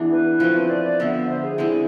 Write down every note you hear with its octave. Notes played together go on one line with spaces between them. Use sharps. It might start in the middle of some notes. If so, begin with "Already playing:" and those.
Already playing: E3 B3 D4 G#4
B4
F3 A3 C4
D5
D5
D3 F3 B3 E5
C5
G#4
D3 G#3 C4 E4